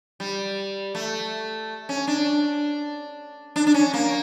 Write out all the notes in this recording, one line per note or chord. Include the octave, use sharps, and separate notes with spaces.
G3
A3
C#4
D4
D4
D4
C#4
A#3